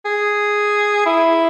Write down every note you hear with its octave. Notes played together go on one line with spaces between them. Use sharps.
G#4
E4